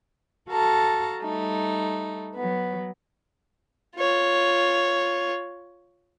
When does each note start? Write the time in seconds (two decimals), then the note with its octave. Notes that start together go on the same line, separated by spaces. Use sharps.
0.49 F#4 A4 F5 A5 A#5
1.21 G3 A3 D#4
2.35 F#3 B3
3.96 F4 C#5